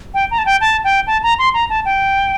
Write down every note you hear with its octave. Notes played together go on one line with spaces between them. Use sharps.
G5
A#5
A5
G5
A5
G5
A5
A#5
C6
A#5
A5
G5